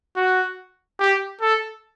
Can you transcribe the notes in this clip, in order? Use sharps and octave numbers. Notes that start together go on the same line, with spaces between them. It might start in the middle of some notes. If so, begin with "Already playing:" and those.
F#4
G4
A4